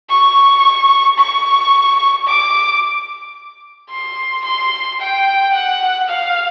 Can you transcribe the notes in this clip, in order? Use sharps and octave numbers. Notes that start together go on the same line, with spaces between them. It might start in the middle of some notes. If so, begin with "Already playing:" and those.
C#6
C#6
D6
C6
C6
G5
F#5
F5